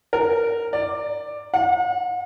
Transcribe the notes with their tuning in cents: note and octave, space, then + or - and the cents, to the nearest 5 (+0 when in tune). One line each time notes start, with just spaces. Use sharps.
A#4 -10
D5 +10
F#5 -45